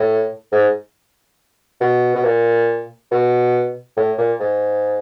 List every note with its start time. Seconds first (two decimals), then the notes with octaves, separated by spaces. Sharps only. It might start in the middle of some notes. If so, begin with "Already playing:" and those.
Already playing: A2
0.52 G#2
1.81 B2
2.15 B2
2.25 A#2
3.11 B2
3.97 A2
4.18 A#2
4.40 G#2